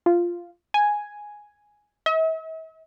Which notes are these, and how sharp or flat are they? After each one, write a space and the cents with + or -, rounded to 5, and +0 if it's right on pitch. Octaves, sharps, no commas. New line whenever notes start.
F4 -5
G#5 +0
E5 -45